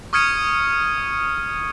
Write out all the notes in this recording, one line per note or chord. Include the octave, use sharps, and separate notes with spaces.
C#6 D#6 F6 G#6 C#7 D#7